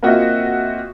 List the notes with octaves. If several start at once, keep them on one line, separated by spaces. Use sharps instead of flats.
A#3 C4 F4 F#4 D#5 E5